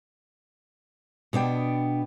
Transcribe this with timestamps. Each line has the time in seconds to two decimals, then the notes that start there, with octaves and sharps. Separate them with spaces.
1.33 B2 B3 D4 G5